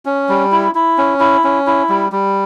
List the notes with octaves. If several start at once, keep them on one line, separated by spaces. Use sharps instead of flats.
C#4
G3
E4
E4
C#4
E4
C#4
E4
G3
G3